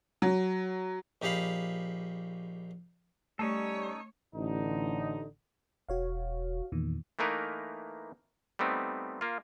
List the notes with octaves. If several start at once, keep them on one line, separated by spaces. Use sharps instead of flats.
F#3
A#1 D#4 G4 G#4 F5 B5
G3 A3 C#4 D#4 A4 C#5
A1 D3 D#4
E1 F#4 C#5 F5
E2 A#2 D#3
E3 A3 A#3 D#4 A#4 B4
G3 A3 B3 C4 D#4
A#3 F4